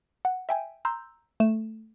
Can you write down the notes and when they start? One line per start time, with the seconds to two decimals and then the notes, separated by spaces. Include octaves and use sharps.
0.25 F#5
0.49 E5 G5 G#5
0.85 A#5 C6 E6 G6
1.40 A3 E7